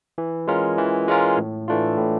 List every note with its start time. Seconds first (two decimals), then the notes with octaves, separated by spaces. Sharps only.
0.18 E3
0.47 G#3 C#4 F4 A#4
0.78 E3
1.08 G#3 C#4 F4 A#4
1.37 A2
1.68 E3 A3 D4 F4
1.98 A2